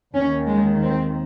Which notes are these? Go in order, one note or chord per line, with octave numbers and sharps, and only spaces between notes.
D#2 D#3 C#4
G#3
C4